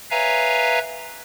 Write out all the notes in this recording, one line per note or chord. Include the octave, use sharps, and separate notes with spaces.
B4 C#5 E5 F5 G#5 A#5